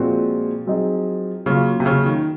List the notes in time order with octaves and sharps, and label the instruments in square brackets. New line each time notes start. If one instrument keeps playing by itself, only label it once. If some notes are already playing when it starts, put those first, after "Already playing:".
Already playing: [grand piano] A#2 G#3 C4 F#4 [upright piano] F3
[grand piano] F#3 C4 D#4 G#4
[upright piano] C#3 [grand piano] F#3 A#3 F4
[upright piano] C3
C#3
D#3